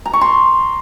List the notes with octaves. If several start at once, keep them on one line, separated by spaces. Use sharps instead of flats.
A#5
C#6
C6